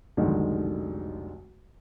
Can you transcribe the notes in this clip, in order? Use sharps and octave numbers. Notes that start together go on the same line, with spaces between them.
F1 B1 D3 D#3 G#3